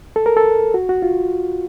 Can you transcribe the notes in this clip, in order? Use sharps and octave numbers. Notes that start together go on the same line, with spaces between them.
A4
A#4
A4
F#4
F#4
F4